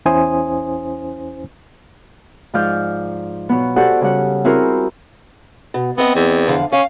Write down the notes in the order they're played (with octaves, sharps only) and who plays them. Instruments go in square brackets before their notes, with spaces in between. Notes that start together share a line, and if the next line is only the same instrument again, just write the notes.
[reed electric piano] E2 C#4 E4 C5 G#5 D#6
[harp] G#2 F3 D5 F6 G6
B2 F#3 B3
F#4 G4 A4 C5 D5 F#5
C#3 G3 F#5
C4 E4 F#4 G#4 A#4 C5
[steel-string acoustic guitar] B2
[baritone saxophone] B3 [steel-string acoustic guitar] C4 D#5
[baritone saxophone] E2
[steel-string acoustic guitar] F2 D3 F5
[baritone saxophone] C#4 [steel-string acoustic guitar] F5